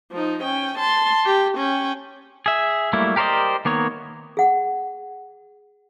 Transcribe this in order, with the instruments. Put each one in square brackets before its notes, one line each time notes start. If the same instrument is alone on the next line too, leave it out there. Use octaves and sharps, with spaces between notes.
[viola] F3 D#4
C#4 G5
A5 C6
G4
C#4 G5
[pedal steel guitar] G#4 E5
F#3 G3 A3 A#3 E4
G4 A#4 C5 D5 D#5
D#3 A#3 B3 C#5
[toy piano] G#4 F#5